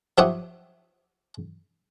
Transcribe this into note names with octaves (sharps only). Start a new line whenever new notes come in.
F3 G4 C#5 E5 F#5 D#6